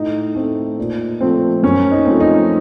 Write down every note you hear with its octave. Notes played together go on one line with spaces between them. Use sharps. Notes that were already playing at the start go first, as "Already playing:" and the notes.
Already playing: A2 D#4
A3 C4
A#2
F3 A3 C4
F#2 C#4
D#4
F3 A3 C4
D#4